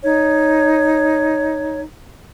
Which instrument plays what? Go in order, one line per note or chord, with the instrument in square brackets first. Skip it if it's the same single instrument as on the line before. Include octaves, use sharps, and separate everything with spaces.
[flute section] D#4 C#5